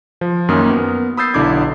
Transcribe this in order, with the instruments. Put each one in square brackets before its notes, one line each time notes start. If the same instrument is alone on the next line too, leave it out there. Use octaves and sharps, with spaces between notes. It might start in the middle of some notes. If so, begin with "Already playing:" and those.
[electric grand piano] F3
F#2 D#3 A#3 C#4 D#6 F6
B3 A#4
B5 D#6 E6 G6 A6 C7
B1 D3 E4 D6 G#6